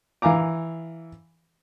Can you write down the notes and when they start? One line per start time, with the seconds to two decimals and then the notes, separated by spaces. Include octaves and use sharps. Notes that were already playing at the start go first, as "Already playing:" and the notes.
0.22 E3 F5 G#5 A#5 D6